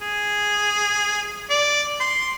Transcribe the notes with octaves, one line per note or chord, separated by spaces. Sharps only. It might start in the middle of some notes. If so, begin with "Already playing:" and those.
G#4
D5
C6